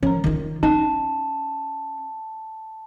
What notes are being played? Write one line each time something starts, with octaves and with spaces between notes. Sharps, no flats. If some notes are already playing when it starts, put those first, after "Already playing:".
F3 C#4 A#4
D#3 F4
C#4 D#4 A5